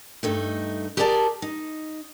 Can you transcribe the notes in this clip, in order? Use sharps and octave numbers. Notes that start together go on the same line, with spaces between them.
G2 A3 D#4
G4 G#4 A#4 D5 G5 A5
D#4